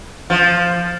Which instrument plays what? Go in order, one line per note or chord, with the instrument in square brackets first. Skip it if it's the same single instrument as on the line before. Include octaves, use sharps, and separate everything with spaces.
[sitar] F3